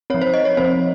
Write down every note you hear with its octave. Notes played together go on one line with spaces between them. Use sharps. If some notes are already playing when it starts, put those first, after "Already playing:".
F3 C4 C#5
C5
D#5
C#5
F3 C4 C5